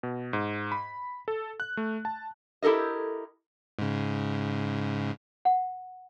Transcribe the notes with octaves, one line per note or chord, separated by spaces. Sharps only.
B2
G#2
B5
A4
F#6
A3
A5
E4 G4 A4 A#4 D#5
G#2 C#3
F#5